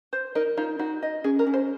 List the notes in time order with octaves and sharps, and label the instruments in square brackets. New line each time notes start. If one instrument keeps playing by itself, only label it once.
[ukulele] C5
[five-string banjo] D#4 [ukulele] A#4
[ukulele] D#4 [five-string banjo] F4
[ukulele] D#4 [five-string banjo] F#4
[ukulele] D#5
[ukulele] C#4 [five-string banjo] G#4
[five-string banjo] A#4
[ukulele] C#4
[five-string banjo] C5